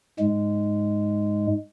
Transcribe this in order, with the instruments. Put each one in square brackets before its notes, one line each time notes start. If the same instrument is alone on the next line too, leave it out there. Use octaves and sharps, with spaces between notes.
[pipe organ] G#2 G#3